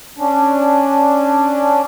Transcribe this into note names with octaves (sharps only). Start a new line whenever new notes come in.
C#4 D4